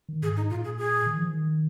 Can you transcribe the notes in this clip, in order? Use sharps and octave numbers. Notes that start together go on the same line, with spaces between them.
D#3
G#2 G#4
D#4
A#2 F4
G#4
G#4
D#3
F3
D#3